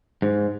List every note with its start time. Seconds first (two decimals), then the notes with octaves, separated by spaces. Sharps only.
0.22 G#2